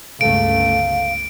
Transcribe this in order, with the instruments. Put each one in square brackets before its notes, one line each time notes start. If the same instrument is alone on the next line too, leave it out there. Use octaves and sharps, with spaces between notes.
[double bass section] G1 C#2 A3 [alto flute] F5 [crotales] D7